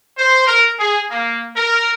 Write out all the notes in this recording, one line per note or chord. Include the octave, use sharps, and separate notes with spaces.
C5
A#4
G#4
A#3
A#4